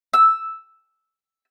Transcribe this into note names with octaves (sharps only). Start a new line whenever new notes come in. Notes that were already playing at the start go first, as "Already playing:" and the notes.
E6